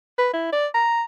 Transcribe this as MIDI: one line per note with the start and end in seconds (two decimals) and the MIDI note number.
0.19 0.28 71
0.33 0.52 64
0.52 0.67 74
0.74 1.03 82